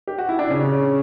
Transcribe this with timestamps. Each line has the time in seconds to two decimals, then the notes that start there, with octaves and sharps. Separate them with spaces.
0.07 G4
0.18 F#4
0.29 E4
0.39 D4
0.50 C#3 C#4